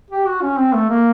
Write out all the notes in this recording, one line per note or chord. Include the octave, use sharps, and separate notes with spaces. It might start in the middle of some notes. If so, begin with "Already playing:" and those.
G4
F#4
C#4
C4
A3
A#3